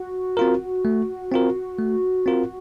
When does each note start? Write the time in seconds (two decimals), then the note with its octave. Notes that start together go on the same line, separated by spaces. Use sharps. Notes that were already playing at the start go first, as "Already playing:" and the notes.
Already playing: F#4
0.37 C4 F4 A#4
0.85 A3
1.31 C4 F4 A#4
1.78 A3
2.26 C4 F4 A#4